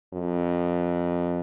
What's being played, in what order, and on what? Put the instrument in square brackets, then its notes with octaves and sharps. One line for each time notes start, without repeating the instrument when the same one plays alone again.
[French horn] F2